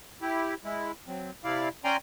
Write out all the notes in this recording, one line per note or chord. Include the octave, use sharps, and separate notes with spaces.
E4 G4
G#3 E4
F#3 C4
C3 E4 D5 F5
C#4 D5 G5 G#5 A#5 C6